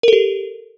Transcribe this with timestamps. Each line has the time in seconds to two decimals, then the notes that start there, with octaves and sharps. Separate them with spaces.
0.03 A#4
0.08 A4
0.13 G4